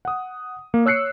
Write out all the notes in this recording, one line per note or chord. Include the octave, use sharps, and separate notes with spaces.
F#5 D#6
A#3
C#5 E6 F#6 C7 C#7